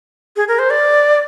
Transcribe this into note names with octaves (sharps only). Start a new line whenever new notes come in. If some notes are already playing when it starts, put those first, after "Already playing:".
G#4
A#4
C5
D5